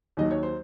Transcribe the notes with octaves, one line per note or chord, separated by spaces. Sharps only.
D#2 D#3 F#3 D#5
C#5
C5